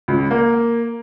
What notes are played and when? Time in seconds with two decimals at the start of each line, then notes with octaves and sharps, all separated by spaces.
0.08 C#2
0.31 A#3